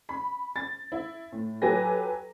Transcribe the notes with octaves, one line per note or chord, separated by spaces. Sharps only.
B5
A6
E4
A2
F#3 G4 A4 B4 G#5 A#6